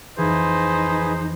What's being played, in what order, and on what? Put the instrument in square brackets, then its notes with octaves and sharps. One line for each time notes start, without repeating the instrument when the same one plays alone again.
[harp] F2 E3 [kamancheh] D#4 [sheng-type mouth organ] G#4 B4 [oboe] C5